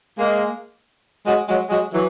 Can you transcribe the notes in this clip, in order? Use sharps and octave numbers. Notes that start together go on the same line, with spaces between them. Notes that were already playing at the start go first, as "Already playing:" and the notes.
G#3 A#3
F#3 G#3
F#3 G#3
F#3 G#3
E3 F#3